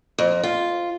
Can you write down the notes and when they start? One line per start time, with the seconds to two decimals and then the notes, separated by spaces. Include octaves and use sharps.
0.18 F2
0.43 F4